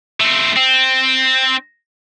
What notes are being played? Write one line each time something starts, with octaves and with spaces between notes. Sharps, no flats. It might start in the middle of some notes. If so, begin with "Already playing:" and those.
A3 C4
C4